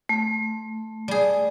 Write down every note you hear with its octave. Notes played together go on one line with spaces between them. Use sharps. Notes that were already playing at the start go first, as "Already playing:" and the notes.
A3
G3 G#4